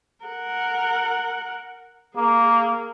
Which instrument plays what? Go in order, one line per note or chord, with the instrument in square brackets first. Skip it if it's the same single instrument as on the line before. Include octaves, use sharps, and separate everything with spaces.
[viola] A#4 F#5
[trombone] A#3 [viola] G#4